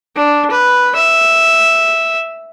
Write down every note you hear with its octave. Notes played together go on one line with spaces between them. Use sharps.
D4
B4
E5